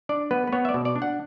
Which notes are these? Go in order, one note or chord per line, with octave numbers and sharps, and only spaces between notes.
D4 D5
B3 B4
B4
B3 C#5
E5
D5
B2
D5
D4
F#5